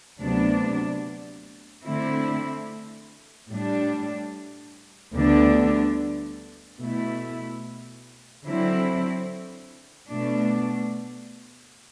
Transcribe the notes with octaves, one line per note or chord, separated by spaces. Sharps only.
D2 C3 F#3 B3 D4
D3 A3 C4 E4
A2 G3 D4
D2 D3 G3 B3 D4
B2 A3 E4
D3 F#3 C4 E4
B2 A3 D4